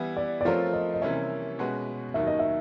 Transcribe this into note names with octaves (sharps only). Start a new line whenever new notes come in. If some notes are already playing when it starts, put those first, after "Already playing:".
Already playing: E3 G3 B3 E4
D5
D5
F3 A3 C4 F4 A#4 C#5
D#5
D#5
C3 E3 G3 A#3 C#4 E5
B2 G#3 C#4 F#4 B4
D#2 D#3 F#3 E5
D#5
E5